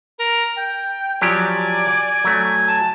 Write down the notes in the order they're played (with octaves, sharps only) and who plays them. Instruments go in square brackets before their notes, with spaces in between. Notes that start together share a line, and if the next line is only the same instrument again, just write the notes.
[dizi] A#4
G5
[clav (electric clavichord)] F3 F#3 G4 [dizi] D5 [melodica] G#5
[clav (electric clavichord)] F#3 A3
[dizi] A5